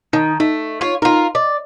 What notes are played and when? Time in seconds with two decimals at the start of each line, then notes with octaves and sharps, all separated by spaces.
0.13 D#3 D#4 A5 D#6
0.40 A3 D#4
0.81 F4 C#5
1.02 D#4 F4 A#4
1.35 D5 D#5